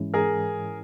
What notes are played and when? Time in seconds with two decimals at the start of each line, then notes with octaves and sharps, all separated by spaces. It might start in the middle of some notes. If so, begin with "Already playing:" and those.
Already playing: G#2 E3 G#3 C#4 E4
0.14 G#4 A#4